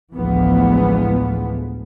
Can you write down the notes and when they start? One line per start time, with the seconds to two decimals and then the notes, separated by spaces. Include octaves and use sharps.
0.15 A1 D2 E3 F3 G#3 B3